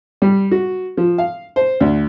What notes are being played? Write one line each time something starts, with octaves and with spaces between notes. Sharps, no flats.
G3
F#4
F3
F5
C5
D2